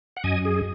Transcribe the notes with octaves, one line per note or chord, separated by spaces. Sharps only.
F#5
F#2 D#5 G#5
G#4